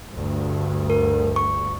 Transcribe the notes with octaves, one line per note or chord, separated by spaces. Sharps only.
D2 G2
A#4
C#6